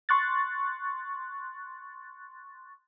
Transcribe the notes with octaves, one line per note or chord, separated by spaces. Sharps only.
C6 C#6 F#6 A6